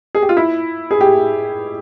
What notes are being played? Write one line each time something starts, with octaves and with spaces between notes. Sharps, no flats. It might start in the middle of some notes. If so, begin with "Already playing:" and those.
G#4
G4
F4
E4
G#4
G4